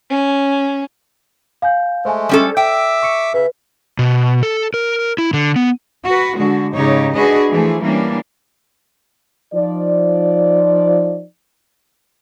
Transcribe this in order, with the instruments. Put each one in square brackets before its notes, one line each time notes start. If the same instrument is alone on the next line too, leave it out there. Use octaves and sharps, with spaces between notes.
[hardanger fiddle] C#4
[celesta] F5 G#5 G6
[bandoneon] G#3 A3 [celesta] C5 G#5
[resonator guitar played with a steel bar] G3 C#4 A4
[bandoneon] E5 D6 E6 [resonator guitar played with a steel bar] G5
[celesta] C#6 C#7
[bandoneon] C#3 E5 [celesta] B4
[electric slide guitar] B2
A4
A#4
E4
D3
B3
[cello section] F#4 B4
D3 G#3 F#4
G#2 C#3 D#4 G4 C#5
D4 F#4 G#4 B4 D#5
E3 F3 A3 G#4
E3 G3 A#3 C#4 D4
[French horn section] F3 D#4 D5